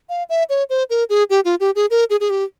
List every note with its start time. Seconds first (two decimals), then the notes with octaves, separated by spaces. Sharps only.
0.09 F5
0.29 E5
0.50 C#5
0.70 C5
0.90 A#4
1.10 G#4
1.30 G4
1.45 F4
1.60 G4
1.76 G#4
1.90 A#4
2.10 G#4
2.20 G#4
2.30 G4